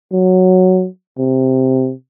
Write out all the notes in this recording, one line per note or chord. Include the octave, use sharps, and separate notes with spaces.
F#3
C3